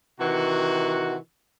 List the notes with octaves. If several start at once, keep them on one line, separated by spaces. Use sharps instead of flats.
C3 D#3 E3 F#4